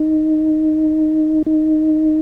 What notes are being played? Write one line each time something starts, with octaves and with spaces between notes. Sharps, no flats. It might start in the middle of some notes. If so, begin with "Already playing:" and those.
Already playing: D#4
D#4